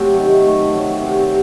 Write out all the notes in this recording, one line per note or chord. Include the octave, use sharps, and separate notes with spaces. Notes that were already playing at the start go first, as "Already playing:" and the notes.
Already playing: C3 F#3 A3
D#3
A3
F#3
C3